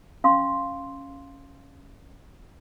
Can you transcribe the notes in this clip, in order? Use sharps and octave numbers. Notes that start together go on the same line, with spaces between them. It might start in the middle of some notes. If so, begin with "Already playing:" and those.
C#4 F5 C6 C#6